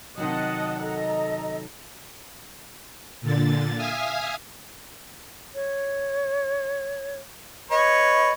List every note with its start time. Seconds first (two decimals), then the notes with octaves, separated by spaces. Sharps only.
0.18 C3 D#3 F#3 D#5 F#5 A5
0.83 A4 D#5 A#5
3.21 A#2 D3 A6
3.76 E5 F5 G#5 D#6 F6
5.55 C#5
7.71 B4 C#5 D#5